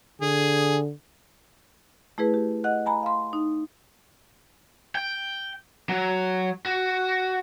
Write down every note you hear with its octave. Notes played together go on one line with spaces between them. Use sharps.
D3 G#4
A3 E4 G#4 B4
G4
D#5 F#5 F#6
G#5 A#5 B5
F5 C6
D#4
G5
F#3
F#4